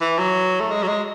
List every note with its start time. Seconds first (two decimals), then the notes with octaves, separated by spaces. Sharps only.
0.01 E3
0.18 F#3
0.60 A3
0.71 G#3
0.83 F#3
0.88 G#3